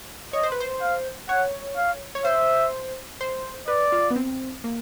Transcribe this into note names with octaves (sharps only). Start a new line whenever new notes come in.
C#5 D#5
C5
B4
C5
F5
C#5 F#5
F5
C#5
C5 E5
C5
B4 D5
F4
B3
C4
A#3